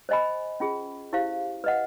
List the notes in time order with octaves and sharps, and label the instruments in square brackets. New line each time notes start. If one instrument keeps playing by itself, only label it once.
[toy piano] C5 D#5 G#5 B5
C#4 F4 G#4
E4 G4 C5 F5
B4 D#5 F#5